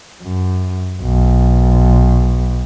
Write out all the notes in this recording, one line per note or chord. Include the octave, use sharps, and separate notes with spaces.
F#2
B1